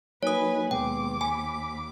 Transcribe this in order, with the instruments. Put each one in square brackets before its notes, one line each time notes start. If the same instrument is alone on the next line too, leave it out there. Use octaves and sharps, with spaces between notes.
[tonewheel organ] F#3 A#3 D#4 [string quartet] B4 G#5 B5 [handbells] C#5 D#6
[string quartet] D#2 D6 [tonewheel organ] B2 G#3 B3 [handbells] G5
[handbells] G#5 [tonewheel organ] B5